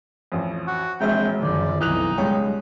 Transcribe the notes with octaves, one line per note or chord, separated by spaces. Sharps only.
A1 F2
F#4
E1 A#1 G#3 C4 E5 G5
F#1 D3 D#3 F3 D5
B1 F2 E3 D#4 F#6 F7
C#2 G3 G#3 C#5 G5